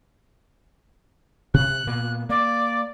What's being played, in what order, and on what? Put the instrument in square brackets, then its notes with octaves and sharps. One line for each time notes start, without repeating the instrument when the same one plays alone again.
[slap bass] C3 [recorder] F#6
[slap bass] A#2 A#3 B3
[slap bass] A#3 [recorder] D5